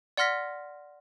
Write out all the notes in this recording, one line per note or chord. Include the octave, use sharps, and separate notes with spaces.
D5 F#5 C6 F6 A#6 B6